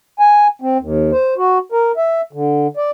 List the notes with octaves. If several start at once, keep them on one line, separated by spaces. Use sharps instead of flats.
G#5
C4
D#2
C5
F#4
A#4
E5
D3
D5